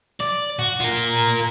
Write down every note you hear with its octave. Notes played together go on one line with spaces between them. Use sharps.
D5
F#4
F4 A#4